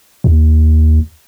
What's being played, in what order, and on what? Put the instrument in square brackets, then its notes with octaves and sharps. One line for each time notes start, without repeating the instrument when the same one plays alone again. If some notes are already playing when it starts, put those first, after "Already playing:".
[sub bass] D#2